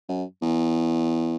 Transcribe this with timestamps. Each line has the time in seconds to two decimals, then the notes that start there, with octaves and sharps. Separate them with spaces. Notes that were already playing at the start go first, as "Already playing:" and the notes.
0.09 F#2
0.42 E2